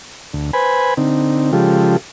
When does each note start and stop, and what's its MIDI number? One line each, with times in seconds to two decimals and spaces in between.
0.34 0.51 38
0.53 0.94 71
0.53 0.94 72
0.53 0.94 80
0.53 0.94 83
0.97 1.52 50
0.97 1.52 60
0.97 1.52 63
1.53 1.97 49
1.53 1.97 53
1.53 1.97 56
1.53 1.97 65
1.53 1.97 67
1.53 1.97 69